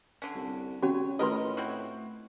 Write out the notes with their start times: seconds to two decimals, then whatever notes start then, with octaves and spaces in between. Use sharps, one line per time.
0.22 D3 C#4
0.35 C2
0.83 C#3 C#4 F#4 C#5
1.19 A2 F4 A#4 B4 D#5 C6
1.57 C4 E4 F#4